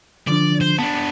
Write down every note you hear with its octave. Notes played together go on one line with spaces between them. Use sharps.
D3 F3 D4 D5
C5
B3 D4 A5